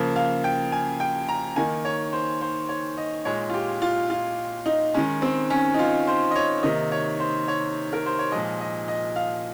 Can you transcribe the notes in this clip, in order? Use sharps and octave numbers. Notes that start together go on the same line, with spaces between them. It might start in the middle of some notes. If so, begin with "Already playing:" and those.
Already playing: C#3 F3 A#3
F5
G5
G#5
G5
A#5
D#3 A#3 G#5
C#5
C5
C5
C#5
D#5
A#2 G#3 C#5
F4
G4
F4
F4
D#4
D#3 G#3 C#4
C4
C#4
D#4
F4
C5
D#5
C#5
C3 D#3 A#3 D#5
C#5
C5
C#5
A#4
C5
C#5
A#2 F3 G#3 D#5
D#5
D#5
F5